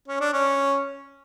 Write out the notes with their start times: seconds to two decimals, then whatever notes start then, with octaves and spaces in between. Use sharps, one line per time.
0.08 C#4
0.20 D4
0.33 C#4